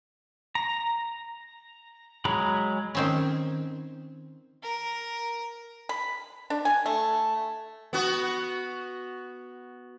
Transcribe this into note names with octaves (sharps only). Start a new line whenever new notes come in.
A#5
F#3 G#3 G#4 A#5 B5
D#3 C4 C#4
A#4
B5
D4
G#5
A3
B3 F#4